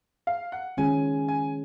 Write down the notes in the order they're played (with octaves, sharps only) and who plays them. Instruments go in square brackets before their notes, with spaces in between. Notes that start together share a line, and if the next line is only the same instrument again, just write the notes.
[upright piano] F5
F#5
[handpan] D#3 G#3 C#4 F4 G#4 [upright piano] G#5
[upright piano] G#5